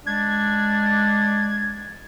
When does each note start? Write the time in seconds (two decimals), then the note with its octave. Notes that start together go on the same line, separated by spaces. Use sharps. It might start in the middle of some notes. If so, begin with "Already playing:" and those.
0.06 G#3 D4 G#6